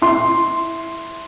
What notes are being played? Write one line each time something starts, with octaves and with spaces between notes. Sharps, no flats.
E4 C6